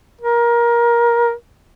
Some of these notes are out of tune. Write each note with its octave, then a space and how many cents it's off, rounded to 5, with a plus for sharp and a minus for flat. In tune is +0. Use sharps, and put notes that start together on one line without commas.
A#4 +20